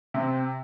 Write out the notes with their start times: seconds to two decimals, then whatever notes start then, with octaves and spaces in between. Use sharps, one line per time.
0.14 C3 C4